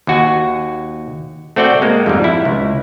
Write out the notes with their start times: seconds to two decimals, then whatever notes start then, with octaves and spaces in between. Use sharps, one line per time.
0.07 D#2 F#4 G#5
1.56 A3 C4 F#4 D5 G5
1.82 G#3 A#3
2.06 F2 G#2 G3
2.24 E4
2.45 C#2